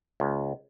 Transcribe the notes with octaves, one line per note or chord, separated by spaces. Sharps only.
C#2